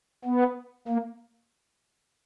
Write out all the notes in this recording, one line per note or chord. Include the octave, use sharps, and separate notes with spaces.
B3
A#3